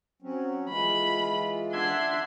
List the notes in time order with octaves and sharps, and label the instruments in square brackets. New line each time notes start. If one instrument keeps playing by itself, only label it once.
[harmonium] F#3 C4 C#4
[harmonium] E3 G#3 F4 [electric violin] B5
[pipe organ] D4 E5 G#6 [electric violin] F#5 C6